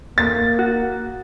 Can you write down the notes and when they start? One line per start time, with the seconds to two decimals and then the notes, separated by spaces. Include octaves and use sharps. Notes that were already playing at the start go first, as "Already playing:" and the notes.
0.18 A#3 A6
0.59 F#4